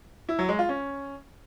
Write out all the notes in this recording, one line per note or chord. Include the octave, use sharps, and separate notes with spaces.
E4
F#3
G#3
F4
C#4